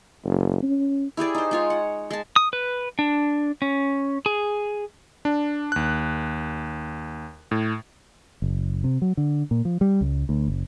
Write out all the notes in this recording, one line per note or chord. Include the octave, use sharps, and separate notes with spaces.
F#1
C#4
E4 G4 G#4 D5
D#4 C5
G#3 F4 C#5
F#5
G#3 A5
D#6
B4
D4
C#4
G#4
D4
D#2 F#6
A2
F#1
C3
F#3
D3
A#2
F3
G3
C#2
D2
F#1